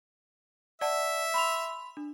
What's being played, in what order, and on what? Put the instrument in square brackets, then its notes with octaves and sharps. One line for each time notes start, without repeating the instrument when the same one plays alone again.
[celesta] D5 F#5 A5 [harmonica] E5
[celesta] B5 C6 F7
D4